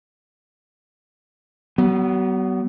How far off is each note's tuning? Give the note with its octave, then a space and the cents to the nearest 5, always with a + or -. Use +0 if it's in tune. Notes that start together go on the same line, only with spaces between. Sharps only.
F#3 +40 B3 +0